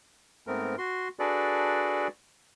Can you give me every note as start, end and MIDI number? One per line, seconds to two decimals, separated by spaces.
0.47 0.76 44
0.47 0.76 57
0.47 0.76 59
0.47 0.76 60
0.47 0.76 70
0.78 1.08 66
0.78 1.08 84
1.19 2.08 62
1.19 2.08 66
1.19 2.08 68
1.19 2.08 69
1.19 2.08 71
1.19 2.08 74